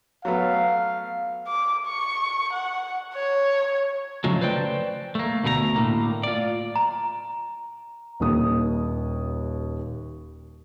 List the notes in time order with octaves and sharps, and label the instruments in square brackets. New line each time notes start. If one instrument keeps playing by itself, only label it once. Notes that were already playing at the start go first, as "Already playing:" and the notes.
[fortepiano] F#3 A3 B3 [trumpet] F5
[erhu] D6
C#6
F#5
C#5
[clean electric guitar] C#3 F3 F#3 G#3 A3
B4 C5 D5 G5
A3 A#3
D2 B2 A3 G4 A#5
A2 A#3
F4 D5
[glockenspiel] A#5
[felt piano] D#1 D#2 D#6